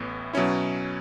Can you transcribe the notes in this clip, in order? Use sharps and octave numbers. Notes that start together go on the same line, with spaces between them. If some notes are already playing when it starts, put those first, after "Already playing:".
Already playing: A1 A2 E3 B3
B2 F#3 C#4 E4